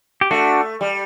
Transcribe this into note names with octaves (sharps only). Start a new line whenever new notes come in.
G4
A3 D4 F#4
G3